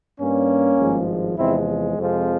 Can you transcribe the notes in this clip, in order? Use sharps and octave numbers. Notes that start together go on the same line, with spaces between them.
G2 G3 A#3 C#4
G#1 G2 F3 G#3
E2 C3 F3 G#3 C4 E4
F2 C3 F3 G#3